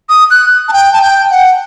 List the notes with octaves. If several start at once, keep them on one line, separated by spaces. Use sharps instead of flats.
D#6
F#6
A5
G5
A5
G5
F#5